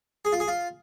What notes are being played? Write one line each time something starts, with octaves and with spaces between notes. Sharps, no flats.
G#4
F4
G#4
F4